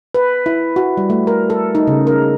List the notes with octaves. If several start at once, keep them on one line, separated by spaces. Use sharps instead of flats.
B4
E4
F#4
G3
A3
A#4
A4
D#4
C#3
A#4